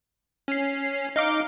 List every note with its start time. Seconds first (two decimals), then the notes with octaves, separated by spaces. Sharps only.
0.48 C#4 C7
1.16 D#4 F5 D6